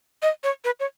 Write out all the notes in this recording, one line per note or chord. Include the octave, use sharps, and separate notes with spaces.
D#5
C#5
B4
C#5